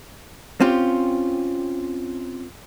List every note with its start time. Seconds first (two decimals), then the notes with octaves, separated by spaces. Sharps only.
0.60 C4 C#4 F4 G4